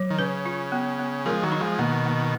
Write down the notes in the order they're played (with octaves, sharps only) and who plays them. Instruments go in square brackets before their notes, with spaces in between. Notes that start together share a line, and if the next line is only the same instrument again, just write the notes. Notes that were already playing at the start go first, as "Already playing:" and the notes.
Already playing: [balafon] F#3
[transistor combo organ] D#3
[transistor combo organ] C#3 [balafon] B4
[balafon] F4
B3
B3
[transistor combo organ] F3 G#3 [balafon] A#4
[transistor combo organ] D#3 F#3
[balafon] D#4
[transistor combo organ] F3 G#3
[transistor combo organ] B2 D#3 [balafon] A#3
[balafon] A#3